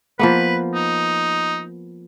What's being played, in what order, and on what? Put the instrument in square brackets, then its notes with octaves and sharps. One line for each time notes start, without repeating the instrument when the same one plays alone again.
[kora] F3 A#3 B3 [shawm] B4
[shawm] D#4